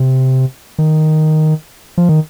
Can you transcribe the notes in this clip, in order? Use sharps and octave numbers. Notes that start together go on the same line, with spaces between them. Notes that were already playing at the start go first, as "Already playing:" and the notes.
Already playing: C3
D#3
F3
D#3